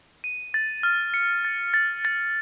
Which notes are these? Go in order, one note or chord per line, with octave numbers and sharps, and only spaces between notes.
D#7
A6
F6
C#7
A6
A6
A6